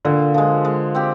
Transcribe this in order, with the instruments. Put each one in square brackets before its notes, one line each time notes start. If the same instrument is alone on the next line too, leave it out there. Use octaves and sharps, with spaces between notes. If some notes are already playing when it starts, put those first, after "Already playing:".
[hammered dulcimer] A#2 [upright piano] D3
[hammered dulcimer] F3 G#3
G#3
C4 G4